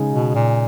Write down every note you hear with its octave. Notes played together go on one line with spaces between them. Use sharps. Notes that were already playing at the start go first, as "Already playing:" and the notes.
Already playing: C#3 G#3 D#4 G#4
B2
A#2